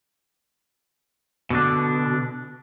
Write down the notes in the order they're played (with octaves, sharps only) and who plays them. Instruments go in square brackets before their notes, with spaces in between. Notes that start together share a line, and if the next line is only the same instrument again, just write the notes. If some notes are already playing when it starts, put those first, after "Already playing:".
[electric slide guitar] B2 D3 D4